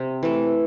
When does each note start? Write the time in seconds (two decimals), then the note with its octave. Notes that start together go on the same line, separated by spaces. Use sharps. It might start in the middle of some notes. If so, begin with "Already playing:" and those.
Already playing: C3
0.23 E3 A3